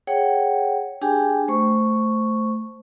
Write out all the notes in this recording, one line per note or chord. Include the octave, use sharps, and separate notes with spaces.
G#4 C#5 F#5 G5
D4 G4 G#4 G5 G#5
A3 C5 C#6